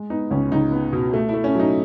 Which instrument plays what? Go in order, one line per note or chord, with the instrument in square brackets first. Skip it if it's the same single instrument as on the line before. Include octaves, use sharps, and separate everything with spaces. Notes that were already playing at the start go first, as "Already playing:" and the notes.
Already playing: [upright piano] G#3
B3 D#4
C#2 C#4
C#2 D#4
B3
B2
A3
E4
A3
C#4
F#3 D#4